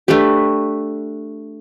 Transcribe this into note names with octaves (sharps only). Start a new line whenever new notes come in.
A3 D4 G4 B4